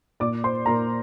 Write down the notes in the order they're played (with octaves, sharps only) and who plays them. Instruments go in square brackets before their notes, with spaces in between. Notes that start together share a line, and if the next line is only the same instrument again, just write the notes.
[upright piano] A#2 D5 D6
C5 C6
A#2 A#4 A#5